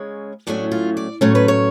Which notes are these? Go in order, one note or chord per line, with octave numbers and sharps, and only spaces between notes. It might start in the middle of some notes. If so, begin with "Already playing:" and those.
Already playing: C#3 G#3 C#4
A2 F#3 A3 C#4 D4
F4
D5
A2 F#3 A3 C#4 C#5
B4
C#5